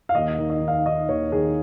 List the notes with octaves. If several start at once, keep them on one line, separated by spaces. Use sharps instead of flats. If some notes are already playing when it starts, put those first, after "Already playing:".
F5
D#2 D#5
D#3
D#5
D#3
F5
D#3 D#5
D#2 C#5
D#3 G#4